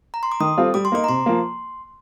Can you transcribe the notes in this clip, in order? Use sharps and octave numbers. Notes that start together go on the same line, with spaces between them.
A#5
C6
D6
D#3 D#6
G3 C4 F4 A4
G3 D6
C6
A#3 D#4 D6
A#5
C3 C6
F3 A#3